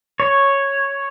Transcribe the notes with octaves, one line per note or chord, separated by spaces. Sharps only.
C#5